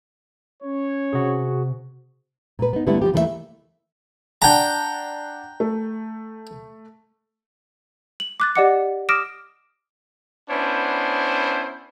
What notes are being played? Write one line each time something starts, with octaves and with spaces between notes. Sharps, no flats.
C#4 C#5
C3 F#4 G#4
A#2 B4
B3 D#4
D3 G3 A3 B3 E4
F3 F4 G4
D#2 E3 A3 A#3 A4 E5
D4 F#5 G5 A5 A#5
A3
F#7
D6 F#6 A6
G4 D5 D#5 F#5 D6 C#7
D6 D#6 F6 A#6 D7 E7
B3 C#4 D4 E4 C5